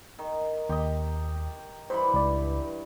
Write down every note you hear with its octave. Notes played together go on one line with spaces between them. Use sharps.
D#3
D#2 G4 D#5
G2 E3 C5 B5
C#2 D5